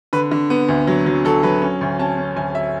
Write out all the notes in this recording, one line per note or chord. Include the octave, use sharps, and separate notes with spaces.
D3 B4
D3
B3
D2
F#3
F#3
F#3 A4
F#3 B4
C#4
D2
C#4 A5
C#4
D2 G#5
E5